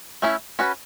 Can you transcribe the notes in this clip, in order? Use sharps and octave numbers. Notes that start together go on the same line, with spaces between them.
A3 C#4 E4
C#4 F#4 B4